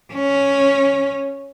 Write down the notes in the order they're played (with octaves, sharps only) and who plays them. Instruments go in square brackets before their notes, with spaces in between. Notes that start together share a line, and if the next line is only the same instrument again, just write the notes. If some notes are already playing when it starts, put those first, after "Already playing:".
[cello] C#4